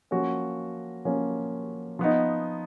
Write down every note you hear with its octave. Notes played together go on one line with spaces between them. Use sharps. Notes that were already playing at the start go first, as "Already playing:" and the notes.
F3 A#3 C#4 F#4
F3 A#3 C#4
F3 B3 D#4